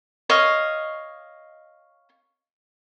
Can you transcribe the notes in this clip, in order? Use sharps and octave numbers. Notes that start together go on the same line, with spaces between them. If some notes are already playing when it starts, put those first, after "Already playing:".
C#5 D#5 F5